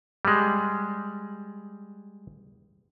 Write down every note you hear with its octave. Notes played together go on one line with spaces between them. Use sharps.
G3 G#3